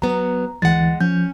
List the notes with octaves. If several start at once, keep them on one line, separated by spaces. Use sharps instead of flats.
F#3 B3 A#5
D2 E3 G#3 F#5 A6
F3 C#4 G6